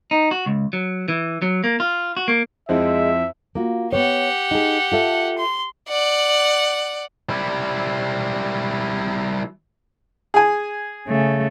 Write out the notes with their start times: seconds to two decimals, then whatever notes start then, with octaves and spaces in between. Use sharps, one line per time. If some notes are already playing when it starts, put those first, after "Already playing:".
0.11 D#4
0.31 F#4
0.46 C#2
0.73 F#3
1.08 E3
1.42 F#3
1.64 A#3
1.80 F4
2.17 F#4
2.28 A#3
2.69 F2 G#3 C4 E4 E5
3.55 A#3 F4 F#4
3.93 B3 G4 C#5 F#5
4.51 D#4 G#4
4.92 F4 A4 E5
5.38 C6
5.89 D5 F#5
7.29 G3 E4
10.34 G#4 G#5
11.08 C#3 A3